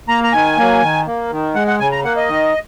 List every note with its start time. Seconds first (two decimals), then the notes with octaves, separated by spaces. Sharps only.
0.08 A#3 A#5
0.24 A#5
0.33 D#3 G#5
0.57 F#3 A#3
0.82 D#3
1.07 A#3
1.31 D#3
1.55 G#3 F#5
1.67 F#5
1.80 C#3 G#5
1.92 A#5
2.04 A#3 F#5
2.16 D#5
2.29 D#3